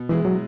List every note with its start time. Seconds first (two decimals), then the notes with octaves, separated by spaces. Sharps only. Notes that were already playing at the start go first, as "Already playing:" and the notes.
Already playing: B2
0.09 E3 G#3 E4 G#4
0.25 F#3